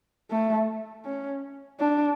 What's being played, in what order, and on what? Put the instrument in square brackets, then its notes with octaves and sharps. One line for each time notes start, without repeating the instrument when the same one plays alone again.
[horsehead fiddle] A3
C#4
D4